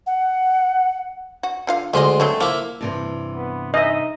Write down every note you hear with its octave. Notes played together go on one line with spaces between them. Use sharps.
F#5
F#4
D3 F4 F5
D2 G#3 D#5 E5 C6
F#3 G#3 A3 C4
F3 A#3 E4
G2 C3 E3
B3
D#4 D#5 E5